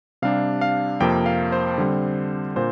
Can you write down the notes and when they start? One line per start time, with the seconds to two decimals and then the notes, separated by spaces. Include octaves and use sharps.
0.22 C3 G3 D4 F5
0.61 F5
1.00 F2 C3 F3 A#3 G5
1.26 F5
1.52 C5
1.78 D3 G3 C4
2.56 A#2 A#3 D4 C5